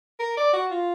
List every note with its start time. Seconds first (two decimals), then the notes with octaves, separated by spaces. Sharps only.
0.20 A#4
0.37 D5
0.53 F#4
0.71 F4